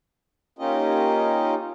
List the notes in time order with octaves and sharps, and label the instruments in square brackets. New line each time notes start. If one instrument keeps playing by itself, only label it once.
[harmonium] A#3 C#4 D#4 F4 G4 D#5